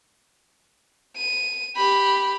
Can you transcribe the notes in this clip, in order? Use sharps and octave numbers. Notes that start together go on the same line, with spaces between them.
D#7
G4 B5